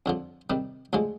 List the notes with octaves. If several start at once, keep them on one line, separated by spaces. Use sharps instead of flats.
F2 D3 F3
C3 D#3 G3
D2 D3 F3 G#3